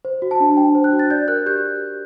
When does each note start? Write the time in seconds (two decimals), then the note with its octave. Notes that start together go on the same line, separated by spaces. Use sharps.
0.05 C5
0.22 F#4
0.31 A5
0.40 D4
0.57 D4 G5
0.75 C5
0.84 F#6
0.93 F#4
0.99 A6
1.10 D5 G6
1.28 A#4 F#6
1.46 G4 G6